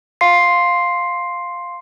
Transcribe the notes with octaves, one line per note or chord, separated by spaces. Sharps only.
F5 C6 C7